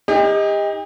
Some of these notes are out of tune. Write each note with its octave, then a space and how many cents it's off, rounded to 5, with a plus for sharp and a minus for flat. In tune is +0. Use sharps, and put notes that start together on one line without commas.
D#4 +15 G4 +40